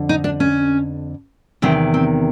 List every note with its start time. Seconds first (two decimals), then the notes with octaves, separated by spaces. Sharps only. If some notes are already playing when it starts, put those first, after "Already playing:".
Already playing: F2 D3
0.09 D#4
0.24 D4
0.40 C#4
1.62 E2 C3 D#3 C4
1.94 C4